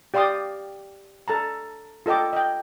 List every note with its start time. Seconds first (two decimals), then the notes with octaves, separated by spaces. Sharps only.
0.14 G4 D5 F5 C6 D6 D#6
1.28 A4 A5 A#5
2.06 F4 A4 D#5 G5 D6
2.33 D#5 G5